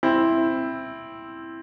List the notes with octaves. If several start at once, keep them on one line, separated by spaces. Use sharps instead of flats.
C4 E4